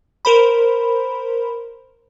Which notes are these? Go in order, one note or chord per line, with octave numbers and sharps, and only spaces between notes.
A#4 C5 B5